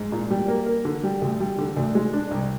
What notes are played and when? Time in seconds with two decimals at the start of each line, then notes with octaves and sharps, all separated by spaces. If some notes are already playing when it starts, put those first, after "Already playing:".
Already playing: G#2
0.12 A#2
0.30 G3
0.48 A#3
0.66 A#3
0.85 D3
1.03 G3
1.22 D2
1.40 G3
1.58 D3
1.77 D2
1.95 G#3
2.13 D4
2.31 C2